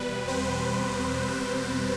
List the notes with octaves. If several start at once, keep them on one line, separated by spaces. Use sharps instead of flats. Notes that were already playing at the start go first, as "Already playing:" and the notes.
Already playing: E2 B2 G3 B4
C4 C5
B4